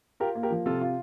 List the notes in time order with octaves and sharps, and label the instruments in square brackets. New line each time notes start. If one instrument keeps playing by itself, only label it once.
[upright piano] F4 [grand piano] G4 A#4
[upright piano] A#3
[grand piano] G4 A#4
[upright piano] F3
[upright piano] C3 [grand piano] F4 A4
[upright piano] F4